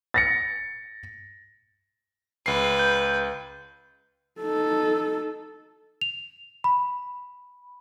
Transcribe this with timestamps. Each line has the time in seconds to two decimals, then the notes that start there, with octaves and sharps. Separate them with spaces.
0.14 A6 A#6 C#7
2.46 C#2 B4 C7
2.79 G6
4.41 D#4 A4
6.01 F7
6.64 B5